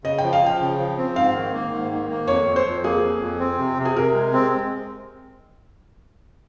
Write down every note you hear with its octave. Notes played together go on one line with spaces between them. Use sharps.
C#3 D#5
F3 G5
F5
F3 G5
C#3
F3
C4
G#2 F5
D#3
A#3
G#2
D#3
A#3
F2 C#5
F2
C5
F2
A#3 G#4
F2
F2
C4
C3
C3
G#4
C3 A#4
G#3
C4